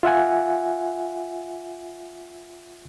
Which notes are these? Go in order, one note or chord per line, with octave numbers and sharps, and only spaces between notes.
F4 E5 F#5 G#5